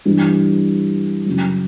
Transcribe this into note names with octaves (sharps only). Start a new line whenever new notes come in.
G2 E3 G3
F#2 C#3 F#3